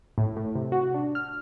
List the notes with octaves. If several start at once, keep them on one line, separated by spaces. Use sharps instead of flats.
A2
A2
C3
F#4
D4
F6